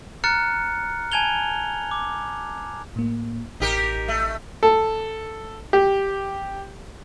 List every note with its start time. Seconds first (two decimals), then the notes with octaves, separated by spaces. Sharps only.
0.24 A#5 F6 F#6 A6 C#7
1.12 G#5 A5 G#6 F7 G7
1.91 D6
2.96 A2 A#3
3.60 A1 D#4 G4 A#4
4.08 A3
4.63 A4
5.73 G4